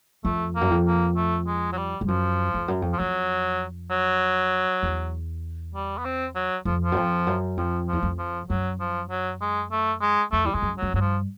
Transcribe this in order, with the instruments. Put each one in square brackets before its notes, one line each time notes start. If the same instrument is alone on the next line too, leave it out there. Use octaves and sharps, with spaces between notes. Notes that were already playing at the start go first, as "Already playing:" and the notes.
[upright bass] F2 [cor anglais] A3
[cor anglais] A#3
[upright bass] F#2
F2
[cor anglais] A#3
A3
G#3
F#3
G3
[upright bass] G2
[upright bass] F#2 [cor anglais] F3
[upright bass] F2
F#2
F2
[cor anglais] F3
[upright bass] F2 [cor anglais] F#3
[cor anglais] F#3
[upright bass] E2
[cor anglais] G3
B3
C4
F#3
[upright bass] F2 [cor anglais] F3
[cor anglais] F3
[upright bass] F#2
F2
F#2
[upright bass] F2 [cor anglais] F3
[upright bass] E2 [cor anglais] F3
[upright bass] F2
[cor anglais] F3
[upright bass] F#2 [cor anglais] F#3
[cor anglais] F3
F#3
G#3
A3
G#3
[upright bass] F2 [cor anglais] A3
[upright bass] E2 [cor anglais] G3
[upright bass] F2 [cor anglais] G#3
[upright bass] F#2
[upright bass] F#2 [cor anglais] F#3
[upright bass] G2 [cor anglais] F#3
[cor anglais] F3